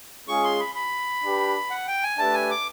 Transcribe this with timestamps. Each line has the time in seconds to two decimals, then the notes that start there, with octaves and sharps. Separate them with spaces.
0.28 G#3 C#4 F4 G#4 C#6
0.44 C6
0.60 B5
0.75 B5
1.23 D4 G4 B4
1.70 F#5
1.87 G5
2.03 G#5
2.18 A3 D4 G4 B4 E5 A5
2.34 G#5
2.51 D6